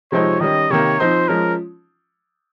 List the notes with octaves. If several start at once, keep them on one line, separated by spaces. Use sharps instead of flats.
C3 F3 G#3 C4 D#4 C#5
D#3 G3 C#4 D#5
C3 D#3 A#3 C#5
F3 C4 D#4 C5
F3 G#3 C#4 A#4